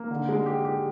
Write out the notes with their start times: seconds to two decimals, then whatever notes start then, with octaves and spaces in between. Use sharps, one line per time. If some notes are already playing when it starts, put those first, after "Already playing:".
Already playing: A#3
0.11 D3
0.29 G#3
0.46 G4
0.65 G4